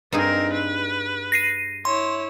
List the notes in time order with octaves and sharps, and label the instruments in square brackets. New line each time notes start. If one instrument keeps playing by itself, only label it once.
[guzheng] G2 D#4 G#4 [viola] C4 A#4
[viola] B4
[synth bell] A#6 C7 D#7
[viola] E4 C#5 [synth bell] C6